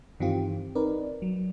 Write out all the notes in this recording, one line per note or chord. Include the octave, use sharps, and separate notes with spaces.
G2 D#3 E3 C4 F4 G4
C4 D#4 A#4 B4 D5
F#3